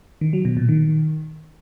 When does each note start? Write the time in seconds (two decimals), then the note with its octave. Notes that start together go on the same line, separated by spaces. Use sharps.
0.21 D#3
0.33 F#3
0.45 B2
0.57 A#2
0.69 D#3